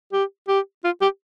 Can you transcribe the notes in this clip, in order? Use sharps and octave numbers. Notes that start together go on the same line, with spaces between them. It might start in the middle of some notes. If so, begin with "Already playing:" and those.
G4
G4
F4
G4